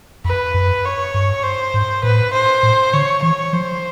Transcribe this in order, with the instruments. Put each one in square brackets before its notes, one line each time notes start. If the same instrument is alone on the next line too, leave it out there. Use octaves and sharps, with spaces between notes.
[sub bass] F2 [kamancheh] B4
[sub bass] F#2
[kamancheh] C#5
[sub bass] G2
[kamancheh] C5
[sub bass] G#2
[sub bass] A2 [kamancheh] B4
[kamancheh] C5
[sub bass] A2
[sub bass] D3 [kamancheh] C#5
[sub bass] E3 [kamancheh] C#5
[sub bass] F3 [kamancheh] C5